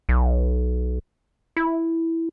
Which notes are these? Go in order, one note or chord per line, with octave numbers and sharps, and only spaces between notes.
B1
E4